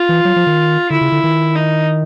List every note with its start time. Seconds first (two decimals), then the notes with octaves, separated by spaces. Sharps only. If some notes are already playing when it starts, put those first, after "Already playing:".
Already playing: F4
0.09 E3
0.25 F#3
0.36 F3
0.47 D#3
0.90 D3 E4
1.01 C#3
1.12 D3
1.24 D#3
1.55 D#4